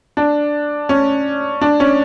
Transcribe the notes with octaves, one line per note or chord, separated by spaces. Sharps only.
D4
C#4
D4
C#4